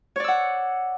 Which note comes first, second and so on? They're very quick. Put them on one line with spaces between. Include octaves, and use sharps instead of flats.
C#5 D5 E6 F#5